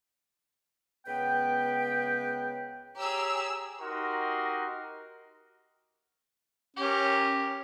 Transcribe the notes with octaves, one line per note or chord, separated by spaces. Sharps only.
C#2 B3 B4 G5
G4 G#4 C#5 A#5 E6
D#4 F#4 G4 A#4 D#5 C6
C#4 G4 A#4